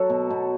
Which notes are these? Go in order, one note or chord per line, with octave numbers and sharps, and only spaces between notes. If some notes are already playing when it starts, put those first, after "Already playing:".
Already playing: F#3 F#4 A4
B2
B2